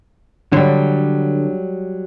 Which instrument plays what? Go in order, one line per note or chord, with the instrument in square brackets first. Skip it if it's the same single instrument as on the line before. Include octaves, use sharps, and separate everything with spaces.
[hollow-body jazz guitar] D3 [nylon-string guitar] F#3 G3